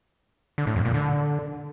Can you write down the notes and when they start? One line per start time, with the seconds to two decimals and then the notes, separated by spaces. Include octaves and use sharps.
0.58 D3
0.67 A2
0.76 F2
0.85 A#2
0.94 D3